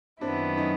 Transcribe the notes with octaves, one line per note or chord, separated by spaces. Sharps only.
F#2 D#3 F#3 B3 C4 D4 E4
C#4 D#4